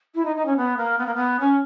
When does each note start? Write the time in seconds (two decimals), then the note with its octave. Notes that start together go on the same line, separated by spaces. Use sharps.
0.15 E4
0.25 D#4
0.36 D#4
0.46 C#4
0.57 B3
0.77 A#3
0.98 B3
1.06 A#3
1.15 B3
1.40 C#4